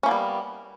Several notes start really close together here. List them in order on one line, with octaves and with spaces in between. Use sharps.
C#4 A#3 B3 G3